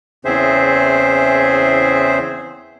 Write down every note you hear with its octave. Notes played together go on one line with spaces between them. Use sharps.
E2 C#3 C4 G#4 C5 E5